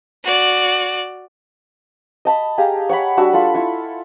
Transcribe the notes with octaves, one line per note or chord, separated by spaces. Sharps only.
F#4 D5
D#5 A5 B5
G4 G#4 F5 A#5
C#5 F#5 B5
G3 D4 F#4 E6
F4 A4 B5
E4 F4 C#6